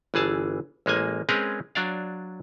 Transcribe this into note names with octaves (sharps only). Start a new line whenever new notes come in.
G1 E3 G#4 A5
A1 G#3 A#3 G#5
G#3 C4 C#4 G#4 A#4 B4
F#3 D4 D5 F5